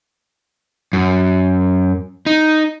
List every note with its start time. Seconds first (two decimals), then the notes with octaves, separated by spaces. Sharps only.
0.93 F#2
2.26 D#4